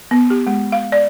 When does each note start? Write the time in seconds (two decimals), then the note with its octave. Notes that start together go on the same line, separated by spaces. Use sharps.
0.11 B3
0.30 G4
0.47 G#3
0.72 F5
0.92 D5